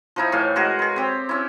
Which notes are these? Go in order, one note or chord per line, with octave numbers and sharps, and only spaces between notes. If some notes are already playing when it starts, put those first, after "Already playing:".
F3 D#4 E4
A2 E3 C#5 F5
G#3 F#4 G#4 A#4
G#4 B4
C4 G4
C#4 E4